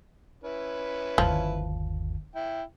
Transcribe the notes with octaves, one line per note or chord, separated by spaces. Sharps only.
C#4 E4 B4
G1 D#2 F3
E4 E5 G5